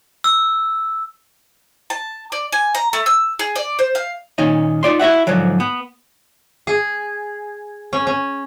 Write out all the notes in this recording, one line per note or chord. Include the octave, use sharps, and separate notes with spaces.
E6
A5
D5
G#5
A#5
A3
E6
G#4
D5
C5
F5
A#2 D#3 C#4 D#4
D#4 F4 D5 C6
E4 F#4 E5 F#5
G#2 D3 F3 F#3
B3
G#4
C#4
C#4